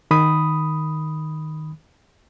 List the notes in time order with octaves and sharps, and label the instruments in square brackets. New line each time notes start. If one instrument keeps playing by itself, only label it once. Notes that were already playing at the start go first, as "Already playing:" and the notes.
[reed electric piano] D#3 B5 D#6